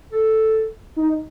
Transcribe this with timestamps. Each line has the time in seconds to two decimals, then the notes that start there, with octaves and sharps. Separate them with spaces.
0.12 A4
0.96 D#4